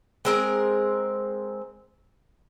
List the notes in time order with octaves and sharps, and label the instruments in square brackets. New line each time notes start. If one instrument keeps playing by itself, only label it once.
[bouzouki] G#3 C4 A#4